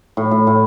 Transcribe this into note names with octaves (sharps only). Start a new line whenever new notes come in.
A2
A2
A2